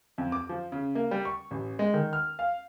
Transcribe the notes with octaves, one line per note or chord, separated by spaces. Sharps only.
F2
D6
F3
C#3
A#3
G3
C#6
A1
G#3
D#3
F6
F5